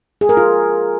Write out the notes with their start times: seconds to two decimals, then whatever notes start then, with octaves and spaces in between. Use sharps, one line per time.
0.21 G#4
0.29 A#4
0.37 F4